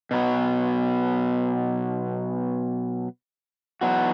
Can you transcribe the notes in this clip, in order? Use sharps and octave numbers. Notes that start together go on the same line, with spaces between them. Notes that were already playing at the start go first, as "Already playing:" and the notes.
B2 F#3 B3
E2 B2 F#3 B3 F#4